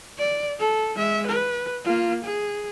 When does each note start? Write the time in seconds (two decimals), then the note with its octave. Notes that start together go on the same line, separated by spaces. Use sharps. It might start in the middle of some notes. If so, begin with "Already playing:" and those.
0.18 D5
0.59 A4
0.97 G#3 E5
1.28 B4
1.84 A#3 F4
2.24 G#4